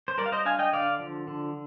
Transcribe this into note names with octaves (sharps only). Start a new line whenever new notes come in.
C5
G3 A#4 D5
F5
C5 D#5
D4 F5 G#5
D#5 G5
D3 D5 F5
F3
D3